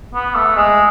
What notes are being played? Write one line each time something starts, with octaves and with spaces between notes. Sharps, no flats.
B3
A3
G#3